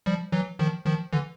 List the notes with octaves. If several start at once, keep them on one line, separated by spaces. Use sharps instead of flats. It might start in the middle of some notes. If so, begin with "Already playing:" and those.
F3 G3
E3 F#3
D#3 F3
D#3 F3
D3 E3